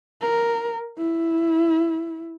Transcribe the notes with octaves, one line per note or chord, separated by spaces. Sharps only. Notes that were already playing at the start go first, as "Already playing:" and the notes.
A#4
E4